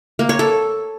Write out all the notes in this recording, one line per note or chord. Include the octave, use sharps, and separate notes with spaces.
A#3
C#5
A4